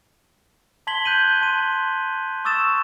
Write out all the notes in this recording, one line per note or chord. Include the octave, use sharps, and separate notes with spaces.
A5 C6 G#6 B6 F#7 G7
F#6 G6 B6 D#7
A5 C6 D#7
C#6 D#6 E6 A6 E7